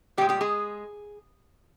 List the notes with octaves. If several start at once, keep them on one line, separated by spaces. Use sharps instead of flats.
A#2 G3 G#3 G4
G3 G4
G#3 G#4